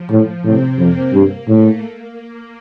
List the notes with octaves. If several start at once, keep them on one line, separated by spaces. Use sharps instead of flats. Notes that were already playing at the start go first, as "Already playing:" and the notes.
Already playing: F3
A2
A2 C3 C4
F2 A#3
G2 A#3
A2 A3
A#3